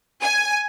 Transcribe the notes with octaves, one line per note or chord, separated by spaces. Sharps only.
G#5